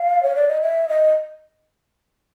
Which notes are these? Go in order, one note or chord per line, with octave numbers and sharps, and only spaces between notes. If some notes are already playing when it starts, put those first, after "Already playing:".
Already playing: F5
C#5
D5
D#5
E5
D#5